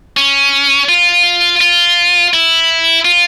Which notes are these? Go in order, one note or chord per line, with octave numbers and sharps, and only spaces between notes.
C#4
F4
F4
E4
F4